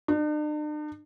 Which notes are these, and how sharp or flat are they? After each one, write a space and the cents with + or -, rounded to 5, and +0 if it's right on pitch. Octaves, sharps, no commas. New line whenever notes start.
D4 +45